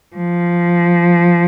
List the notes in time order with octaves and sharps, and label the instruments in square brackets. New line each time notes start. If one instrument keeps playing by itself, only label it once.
[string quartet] F3